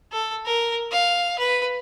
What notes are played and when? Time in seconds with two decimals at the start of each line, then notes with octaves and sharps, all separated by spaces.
0.12 A4
0.45 A#4
0.92 F5
1.38 B4